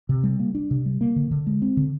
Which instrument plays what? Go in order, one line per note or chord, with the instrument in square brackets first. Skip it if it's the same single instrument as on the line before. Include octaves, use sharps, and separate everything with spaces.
[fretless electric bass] C3
G3
A#3
D4
C3
G3
A#3
D3
D3
G#3
C4
D3